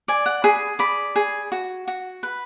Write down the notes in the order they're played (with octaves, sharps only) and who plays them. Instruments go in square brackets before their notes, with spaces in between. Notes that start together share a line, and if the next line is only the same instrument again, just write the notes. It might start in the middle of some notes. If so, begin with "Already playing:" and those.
[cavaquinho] D5 G#5
F#5
G#4 B5
D5 B5
G#4
F#4
F#4
B4